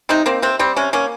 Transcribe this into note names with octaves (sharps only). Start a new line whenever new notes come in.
C3 C4 D#4
A#3 C4
C3 C4
G3 C4
C3 C#4
A#3 C#4